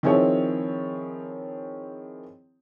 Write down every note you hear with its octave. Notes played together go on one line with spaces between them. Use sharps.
D#3 F3 C4 E4 G#4 C#5